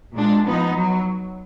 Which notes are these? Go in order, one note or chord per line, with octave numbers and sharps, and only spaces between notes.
A#2 G#3 D4
F3 B3 D#4
F#3